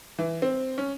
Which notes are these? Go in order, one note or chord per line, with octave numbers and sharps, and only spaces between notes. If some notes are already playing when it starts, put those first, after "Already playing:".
E3
C4
C#4